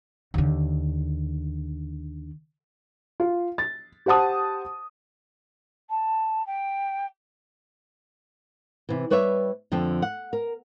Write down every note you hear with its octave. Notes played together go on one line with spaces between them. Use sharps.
D#2 D3
F4
A6
G4 C5 F#5 A5 D#6
A5
G5
C3 E3
G3 B4 C#5 D5 E5
F2 D3 F3 G5 A5
F#5
A#4